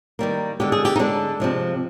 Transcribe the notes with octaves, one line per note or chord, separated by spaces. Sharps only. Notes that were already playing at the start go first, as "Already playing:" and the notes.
D#3 G3 A#3
D3 G#3 G4
G#4
G4
D#4
D3 G#3 D4
C3 F3 G#3